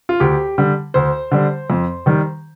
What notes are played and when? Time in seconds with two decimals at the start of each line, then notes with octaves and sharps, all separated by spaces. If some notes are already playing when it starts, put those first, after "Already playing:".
0.09 F4
0.20 D2 G4
0.58 D3 G3
0.94 D2 C5
1.31 D3 G3
1.70 F2
2.06 D#3 G3